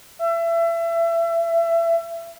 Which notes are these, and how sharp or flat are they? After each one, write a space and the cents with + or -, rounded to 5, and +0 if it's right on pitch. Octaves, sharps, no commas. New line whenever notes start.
E5 +30